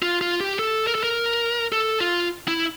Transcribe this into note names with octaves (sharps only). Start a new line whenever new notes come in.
F4
F4
G4
A4
A#4
A4
A#4
A4
F4
E4